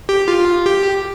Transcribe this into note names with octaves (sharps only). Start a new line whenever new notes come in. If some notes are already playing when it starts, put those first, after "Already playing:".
G4
F4
G4